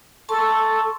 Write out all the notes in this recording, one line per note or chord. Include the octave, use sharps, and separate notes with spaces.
A4 A5 C6 C#6